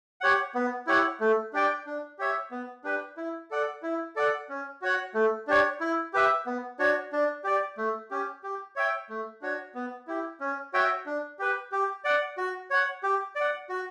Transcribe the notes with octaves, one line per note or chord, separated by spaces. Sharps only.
G4 C#5 F#5
B3
E4 G4 C#5 F#5
A3
D4 G4 D5 G5
D4
G4 C#5 E5
B3
D4 G4 B4
E4
A4 D5 F#5
E4
A4 D5 F#5
C#4
F#4 C#5 F#5
A3
D4 G4 C#5
E4
G4 B4 E5
B3
D4 F#4 C#5
D4
G4 D5
A3
C#4 G4
G4
C#5 E5 G5
A3
D4 F#4 C#5
B3
E4 G4
C#4
F#4 C#5 E5 G5
D4
G4 B4
G4
D5 F#5
F#4
C#5 F#5
G4
D5
F#5
F#4